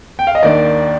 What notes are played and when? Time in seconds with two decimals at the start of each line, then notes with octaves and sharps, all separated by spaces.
0.19 G5
0.27 F5
0.35 D#5
0.43 D#2 D#3 A#3 D4 D5